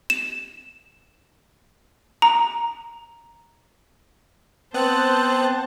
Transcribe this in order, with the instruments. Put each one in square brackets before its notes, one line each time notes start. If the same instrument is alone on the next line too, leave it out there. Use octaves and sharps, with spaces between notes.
[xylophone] E7
A#5
[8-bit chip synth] B3 F#6 [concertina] C4 [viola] C5 A5